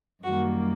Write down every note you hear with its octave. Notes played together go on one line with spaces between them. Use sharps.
F#2 D#3 G3 A#3 F#4